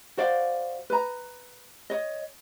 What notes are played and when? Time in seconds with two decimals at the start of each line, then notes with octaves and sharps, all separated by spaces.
0.17 F#4 C5 D5 F5
0.90 B4 A#5
1.90 C#5 D#5